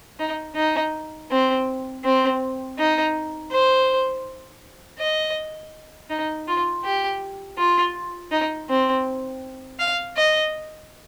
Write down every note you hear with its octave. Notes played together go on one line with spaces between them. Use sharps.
D#4
D#4
C4
C4
D#4
C5
D#5
D#4
F4
G4
F4
D#4
C4
F5
D#5